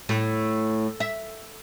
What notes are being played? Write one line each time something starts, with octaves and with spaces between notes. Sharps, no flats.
A2
E5